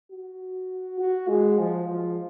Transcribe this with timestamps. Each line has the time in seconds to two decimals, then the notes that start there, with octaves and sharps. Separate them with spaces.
0.12 F#4
1.00 F#4
1.28 G#3
1.58 F3
1.88 F3